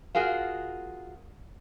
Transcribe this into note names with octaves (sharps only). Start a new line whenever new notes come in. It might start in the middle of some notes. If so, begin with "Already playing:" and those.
F4 F#4 G#4 A#4 F5